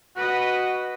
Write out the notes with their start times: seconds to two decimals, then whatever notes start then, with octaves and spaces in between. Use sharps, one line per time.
0.16 F#4 B4 D#5